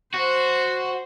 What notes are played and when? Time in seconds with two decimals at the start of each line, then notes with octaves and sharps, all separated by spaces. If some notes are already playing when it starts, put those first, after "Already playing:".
0.14 F#4 C5